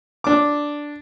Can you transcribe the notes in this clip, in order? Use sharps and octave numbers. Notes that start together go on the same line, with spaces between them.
D4 D6